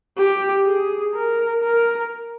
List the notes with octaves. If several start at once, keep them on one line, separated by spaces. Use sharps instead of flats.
G4
G#4
A#4
A#4